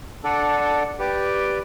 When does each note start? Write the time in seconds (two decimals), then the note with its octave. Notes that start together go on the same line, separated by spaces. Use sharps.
0.24 D4 A4 D5 F#5
0.99 G4 B4 D5 G5